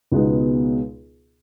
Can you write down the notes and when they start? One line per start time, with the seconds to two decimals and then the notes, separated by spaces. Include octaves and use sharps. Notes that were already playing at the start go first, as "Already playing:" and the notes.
0.12 C#2 B2 G#3 B3 D#4